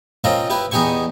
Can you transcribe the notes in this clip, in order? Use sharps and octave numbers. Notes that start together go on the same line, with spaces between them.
C4 C#4 F4 A#4 D#5
E4 G4 B4
E2 B3 D#4 G4 G#5 C#6